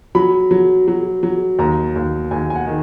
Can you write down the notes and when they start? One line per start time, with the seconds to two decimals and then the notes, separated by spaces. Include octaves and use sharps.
0.15 F#3 B5
0.51 F#3
0.88 F#3
1.23 F#3
1.59 D#2 A#5
1.96 D#2
2.31 D#2 G#5
2.50 G#5
2.56 F#5
2.67 D#3